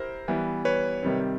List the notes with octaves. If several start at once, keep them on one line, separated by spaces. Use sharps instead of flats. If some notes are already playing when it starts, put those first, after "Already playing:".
Already playing: E4 G4 A#4 C5
E3 G3 B3
B4 C#5
C3 D#3 G3 C4